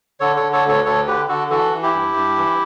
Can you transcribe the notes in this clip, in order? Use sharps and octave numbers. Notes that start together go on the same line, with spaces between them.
D3 A4 C#5
D3 A4 C#5
A4 C#5
D2 A4 C#5
D2 A4 C#5
D3 G4 B4
D3 F#4 A4
E3 F#4 A4
E3
E4 G4
G2
G2
E3